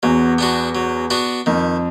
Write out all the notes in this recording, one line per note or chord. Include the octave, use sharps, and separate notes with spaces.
E2 F#3
B3 D4 F#4
F#3
B3 D4 F#4
F2 D#3